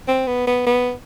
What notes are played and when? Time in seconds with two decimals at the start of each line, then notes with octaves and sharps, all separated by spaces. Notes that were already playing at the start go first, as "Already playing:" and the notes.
0.08 C4
0.27 B3
0.47 B3
0.66 B3